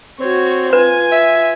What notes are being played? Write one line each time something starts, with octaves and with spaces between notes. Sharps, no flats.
C4 F#4 C#5
F4 B4 G#5
E5